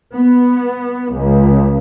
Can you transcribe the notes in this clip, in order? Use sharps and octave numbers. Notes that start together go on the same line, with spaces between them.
B3
C#2